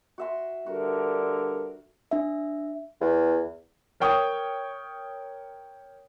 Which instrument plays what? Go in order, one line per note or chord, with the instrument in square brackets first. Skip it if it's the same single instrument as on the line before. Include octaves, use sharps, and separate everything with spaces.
[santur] F#4 E5 C6
[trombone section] G2 D3 A#4 [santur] F#4
[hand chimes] D4 E5
[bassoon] E2
[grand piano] A#4 C#5 G5 C#6 D#6